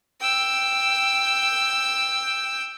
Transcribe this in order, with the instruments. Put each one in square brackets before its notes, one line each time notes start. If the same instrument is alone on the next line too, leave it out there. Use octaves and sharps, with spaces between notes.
[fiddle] G5 E6